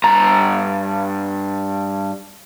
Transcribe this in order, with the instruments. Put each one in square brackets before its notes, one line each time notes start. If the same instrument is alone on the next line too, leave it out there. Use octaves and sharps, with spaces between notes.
[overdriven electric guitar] G2 A#5